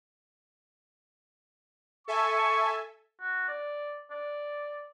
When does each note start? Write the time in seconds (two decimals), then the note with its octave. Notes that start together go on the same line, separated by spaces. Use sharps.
2.08 A4 E5 G#5 C#6
3.21 F#4
3.48 D5
4.10 D5